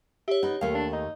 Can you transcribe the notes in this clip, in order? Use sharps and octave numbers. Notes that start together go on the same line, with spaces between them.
G4 C#5 E5
B3 D#4 C#5
D#2 A3 F5
D4
D#4